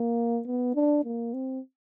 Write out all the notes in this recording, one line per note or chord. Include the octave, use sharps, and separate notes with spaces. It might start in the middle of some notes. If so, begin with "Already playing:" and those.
Already playing: A#3
B3
D4
A#3
C4